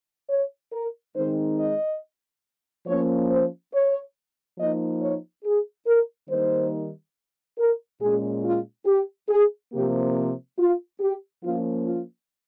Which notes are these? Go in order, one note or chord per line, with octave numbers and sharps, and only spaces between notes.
C#5
A#4
D#3 G#3 C4 D#4 C5
D#5
F3 A#3 C#4 C#5
C5
C#5
F3 A#3 D#4 D#5
C#5
G#4
A#4
D#3 G3 A#3 D#4 C5
A#4
A#2 G#3 C#4 G#4
F4
G4
G#4
C3 F3 A#3 G4
F4
G4
F3 A#3 C#4 F4
F4